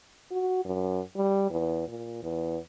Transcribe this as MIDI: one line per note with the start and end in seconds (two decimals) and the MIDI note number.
0.31 0.61 66
0.65 1.00 42
1.16 1.47 55
1.50 1.86 40
1.88 2.20 46
2.23 2.58 40